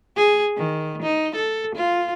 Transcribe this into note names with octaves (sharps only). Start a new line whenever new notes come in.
G#4
D#3
D#4
A4
F4